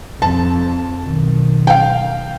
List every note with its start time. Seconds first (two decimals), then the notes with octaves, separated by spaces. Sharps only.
0.22 F2 A5
1.04 B1 D#3
1.67 F5 G5